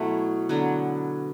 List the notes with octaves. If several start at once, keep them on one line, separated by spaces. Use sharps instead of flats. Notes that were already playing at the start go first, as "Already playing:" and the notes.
Already playing: B2 F#3 A3 E4
D3 F#3 B3